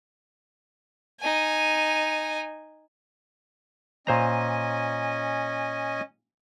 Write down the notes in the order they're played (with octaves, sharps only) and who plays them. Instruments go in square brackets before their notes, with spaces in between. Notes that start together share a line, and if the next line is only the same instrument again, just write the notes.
[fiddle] D#4 G#5
[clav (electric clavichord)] A#2 C5 A#5 [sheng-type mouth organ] C#4 D#5 G#5